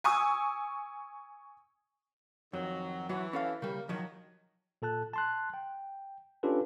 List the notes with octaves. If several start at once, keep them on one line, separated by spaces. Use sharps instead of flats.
G#5 C#6 D#6 E6
F2 D#3 F#3
E3 F#3 F#4 C#5
C#4 A4 F5
C#3 G3 A#3
D#3 F3 F#3
A#2 A4 A5 F#6
A5 C6 F#6
G5
C#4 D4 F4 G4 A4 B4